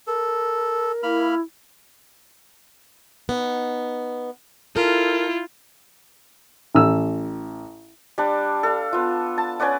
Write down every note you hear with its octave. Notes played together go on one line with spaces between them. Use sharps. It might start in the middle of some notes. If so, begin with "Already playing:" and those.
A4 A#4
A#3 E4 B5 F6
B3 D#4
E4 F4 A4 A#4
A1 E6
G3 D4
A4 F5
B3 F4
A5
C#4 B4 D5 F#5